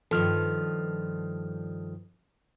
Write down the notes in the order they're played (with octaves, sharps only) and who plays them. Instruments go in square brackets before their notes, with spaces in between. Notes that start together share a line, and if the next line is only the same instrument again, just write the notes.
[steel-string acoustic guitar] G2 D#3 F3 [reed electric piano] A4 F6